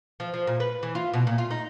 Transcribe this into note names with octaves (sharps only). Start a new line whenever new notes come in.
F3
F3
A#2
B4
E3
F4
B2
A#2
F4
D#4